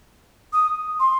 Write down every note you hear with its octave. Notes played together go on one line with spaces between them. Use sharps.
D#6
C6